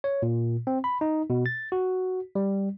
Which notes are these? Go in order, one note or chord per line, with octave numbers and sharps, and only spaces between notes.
C#5
A#2
C4
B5
D#4
B2
A6
F#4
G3